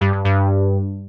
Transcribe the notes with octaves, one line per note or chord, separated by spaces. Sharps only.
G2
G2
G2